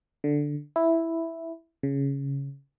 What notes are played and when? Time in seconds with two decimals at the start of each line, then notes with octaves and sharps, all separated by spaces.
0.24 D3
0.76 E4
1.83 C#3